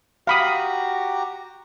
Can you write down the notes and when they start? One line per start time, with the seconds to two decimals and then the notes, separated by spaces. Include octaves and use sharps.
0.27 F#4 G4 F5 A#5 B5 D#6